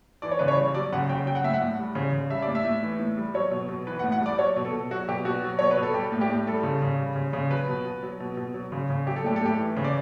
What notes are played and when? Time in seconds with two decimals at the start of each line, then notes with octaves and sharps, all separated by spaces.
0.22 E3 D5
0.31 C#5
0.39 C#3 B4
0.48 C#5
0.57 G3
0.74 F#3 D5
0.93 C#3 F#5
1.09 C#3 G5
1.26 F#3 G5
1.35 F#5
1.44 A2 E5
1.54 F#5
1.61 A2
1.79 G3
1.95 C#3
2.13 C#3
2.30 G3 E5
2.42 D5
2.48 A2
2.55 E5
2.65 A2
2.83 E3
3.00 A2
3.17 G3
3.34 F#3 C#5
3.51 B2
3.69 B2
3.87 E3 B4
3.99 F#5
4.04 A2
4.12 F#5
4.21 G3
4.26 D5
4.38 F#3 C#5
4.56 B2
4.65 A4
4.73 B2
4.91 F#3 F#4
5.08 B2 G4
5.25 B2 F#4
5.43 F#3
5.59 B2 C#5
5.71 B4
5.77 B2
5.83 A4
5.94 G3 G4
6.12 A2
6.21 G4
6.29 A2
6.47 G3 A4
6.63 C#3
6.82 C#3
6.99 G3
7.16 C#3
7.33 C#3
7.51 F#3 B4
7.68 B2
7.85 B2
8.03 F#3
8.20 B2
8.37 B2
8.54 F#3
8.72 C#3
8.90 C#3
9.07 F#3 G4
9.16 A4
9.24 A2 G4
9.36 A4
9.41 A2 G4
9.59 E3
9.77 C#3
9.84 D5